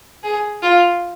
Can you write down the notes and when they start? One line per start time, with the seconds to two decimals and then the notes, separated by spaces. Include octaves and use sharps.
0.24 G#4
0.63 F4